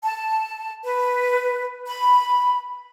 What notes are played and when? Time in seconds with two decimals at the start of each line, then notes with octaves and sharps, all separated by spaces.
0.03 A5
0.84 B4
1.86 B5